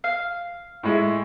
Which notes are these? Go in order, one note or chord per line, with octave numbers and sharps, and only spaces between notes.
F5
A2 G#3 E4